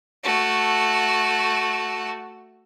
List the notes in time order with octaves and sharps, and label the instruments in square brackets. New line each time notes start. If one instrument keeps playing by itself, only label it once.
[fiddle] A3 F#4